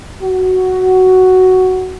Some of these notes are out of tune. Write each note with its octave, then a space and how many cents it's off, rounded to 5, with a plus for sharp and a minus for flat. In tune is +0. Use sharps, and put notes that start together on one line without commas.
F#4 +5